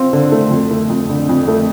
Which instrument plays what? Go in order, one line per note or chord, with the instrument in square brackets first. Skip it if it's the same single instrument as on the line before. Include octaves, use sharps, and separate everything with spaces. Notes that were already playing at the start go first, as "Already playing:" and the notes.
Already playing: [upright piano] C4 F4
D3
A3
F2
A3
F2
D3
F2
A3